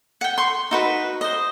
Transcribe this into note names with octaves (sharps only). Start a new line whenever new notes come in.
F#5 G5
C6 C#6
D#4 F#4 B4
C5 D#5